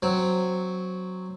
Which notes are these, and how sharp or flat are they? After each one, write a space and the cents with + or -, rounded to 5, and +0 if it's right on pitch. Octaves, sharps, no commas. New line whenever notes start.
F#3 +0 C4 +0